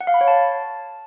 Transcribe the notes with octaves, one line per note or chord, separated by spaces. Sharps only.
F#5
F5
B5
C#5
A5